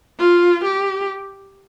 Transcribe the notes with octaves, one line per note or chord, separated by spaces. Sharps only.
F4
G4